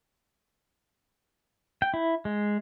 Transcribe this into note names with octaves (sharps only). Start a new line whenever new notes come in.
G5
E4
G#3